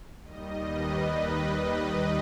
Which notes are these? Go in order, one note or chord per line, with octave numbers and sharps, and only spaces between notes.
D#2 D#3 G3 D#5
B4